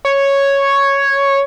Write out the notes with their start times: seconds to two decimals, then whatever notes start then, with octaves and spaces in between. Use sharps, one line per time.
0.05 C#5